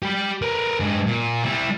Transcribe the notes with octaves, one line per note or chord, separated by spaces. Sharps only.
G4 B5
A#4 B4
G2 G#3
A#2
G3 E4